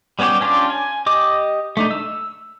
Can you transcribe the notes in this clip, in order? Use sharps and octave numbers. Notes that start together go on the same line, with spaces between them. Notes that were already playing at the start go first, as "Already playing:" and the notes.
G3 B3 C#4 F#4 G4
C#4 D4 F4 G4 D5
G#5
G4 D#5 D6
A3 D4 D#4
E6